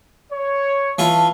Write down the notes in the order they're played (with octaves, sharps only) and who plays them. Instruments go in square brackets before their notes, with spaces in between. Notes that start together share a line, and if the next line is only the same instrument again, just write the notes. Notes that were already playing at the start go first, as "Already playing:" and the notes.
[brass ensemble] C#5
[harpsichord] E3 F4 [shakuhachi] A5